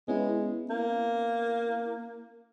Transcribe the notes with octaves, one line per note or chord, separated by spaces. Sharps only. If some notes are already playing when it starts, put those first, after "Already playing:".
G#3 B3 C#4 E4
A#3